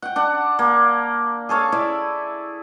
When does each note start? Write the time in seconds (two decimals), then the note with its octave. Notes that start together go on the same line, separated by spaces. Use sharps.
0.02 F#5 G5
0.16 D4 F#5
0.59 A#3
1.49 G#4 A4 C#5 F5
1.72 E4 D5 E5